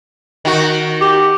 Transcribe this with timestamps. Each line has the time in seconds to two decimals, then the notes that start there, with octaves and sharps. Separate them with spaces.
0.45 D#3 F#4
1.01 G4